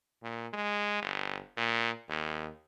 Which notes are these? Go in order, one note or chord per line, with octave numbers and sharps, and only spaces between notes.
A#2
G#3
G1
A#2
D#2